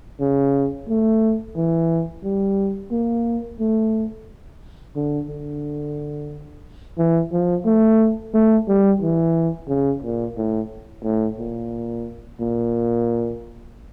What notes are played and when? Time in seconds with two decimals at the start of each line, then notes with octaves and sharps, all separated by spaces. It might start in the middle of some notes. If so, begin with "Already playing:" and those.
0.20 C#3
0.89 A3
1.56 E3
2.23 G3
2.91 A#3
3.60 A3
4.96 D3
5.28 D3
6.98 E3
7.32 F3
7.65 A3
8.34 A3
8.68 G3
9.02 E3
9.69 C#3
10.02 A#2
10.37 A2
11.04 A2
11.39 A#2
12.40 A#2